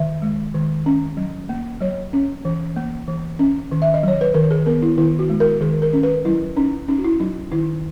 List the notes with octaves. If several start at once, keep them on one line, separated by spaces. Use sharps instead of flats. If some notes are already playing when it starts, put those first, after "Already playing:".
Already playing: D#3 E5
G#3
D#3
C#4
F#3
A#3
F#3 C#5
C#4
E3
A#3
E3
C#4
D#3
E5
D#5
F#3 C#5
B4
D#3 A#4
G#4
B3 A#4
E4
D#3 E4
F#4
G#3
A#4
D#3 G#4
A#4
C#4
B4
F#3 E4
C#4 D#4
C#4 D#4
F#4
E4
F#3 D#4
D#3 E4